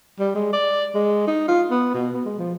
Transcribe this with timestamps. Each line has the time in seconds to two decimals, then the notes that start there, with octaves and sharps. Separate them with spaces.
0.20 G3
0.35 G#3
0.53 D5
0.95 G#3
1.27 D#4
1.48 F4
1.71 B3
1.94 B2
2.14 B3
2.25 G#3
2.39 F3